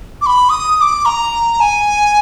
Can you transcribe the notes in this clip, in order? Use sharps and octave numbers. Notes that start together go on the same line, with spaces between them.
D6
B5
D#6
D#6
D6
A#5
G#5